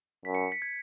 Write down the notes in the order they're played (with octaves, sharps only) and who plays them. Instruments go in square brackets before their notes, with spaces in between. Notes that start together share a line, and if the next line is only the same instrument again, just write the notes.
[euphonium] F#2 [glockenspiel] B6
[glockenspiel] C#7
B6
G#6